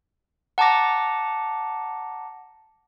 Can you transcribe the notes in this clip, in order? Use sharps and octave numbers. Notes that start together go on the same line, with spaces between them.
F#5 A5 A#5 D6 A#6